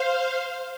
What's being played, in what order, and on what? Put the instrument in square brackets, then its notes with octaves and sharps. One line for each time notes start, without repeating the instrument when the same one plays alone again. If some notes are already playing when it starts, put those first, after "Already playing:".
Already playing: [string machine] C5 F5